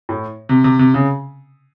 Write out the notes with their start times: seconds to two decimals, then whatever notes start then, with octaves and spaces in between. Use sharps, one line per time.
0.09 A2
0.49 C3
0.64 C3
0.79 C3
0.94 C#3